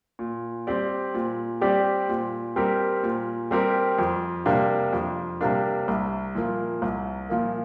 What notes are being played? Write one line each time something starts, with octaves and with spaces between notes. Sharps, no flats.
A#2
G3 C4 G4 D5
A#2
G3 C4 G4 D5
A#2
G3 C4 G4 A#4
A#2
G3 C4 G4 A#4
F2
C3 G3 A#3 D4
F2
C3 G3 A#3 D4
C2
A#2 F3 A#3
C2
A#2 F3 A#3